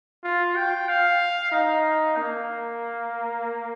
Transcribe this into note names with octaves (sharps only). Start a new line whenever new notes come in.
F4
G5
F5
D#4
A#3